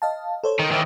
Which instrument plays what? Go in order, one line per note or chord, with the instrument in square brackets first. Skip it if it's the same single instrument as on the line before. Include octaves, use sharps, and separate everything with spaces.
[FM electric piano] D#5 F5 A5
A4 C5 C#5
[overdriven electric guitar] D#3
D#3 E3